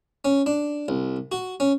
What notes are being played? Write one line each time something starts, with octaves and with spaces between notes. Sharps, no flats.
C#4
D4
C2
F#4
C#4